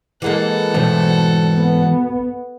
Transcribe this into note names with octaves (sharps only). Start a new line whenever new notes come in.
E3 G#3 A#3 A4 F#5
G#2 B2 E3 A3 C5
B3